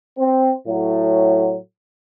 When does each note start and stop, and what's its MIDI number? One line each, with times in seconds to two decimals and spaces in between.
0.19 0.52 60
0.68 1.56 45
0.68 1.56 54